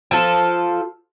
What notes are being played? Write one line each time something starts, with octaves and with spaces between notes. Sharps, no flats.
F3 A4